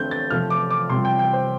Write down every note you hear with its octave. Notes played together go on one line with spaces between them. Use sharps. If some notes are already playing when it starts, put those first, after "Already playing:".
Already playing: D3 A3 C4 G6
A6
C3 F3 A3 F6
D6
D6
C3 G3 F4 C6
G5
G5
C5